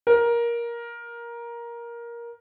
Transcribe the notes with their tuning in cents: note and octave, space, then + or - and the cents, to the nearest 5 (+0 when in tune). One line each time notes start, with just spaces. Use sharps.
A#4 +15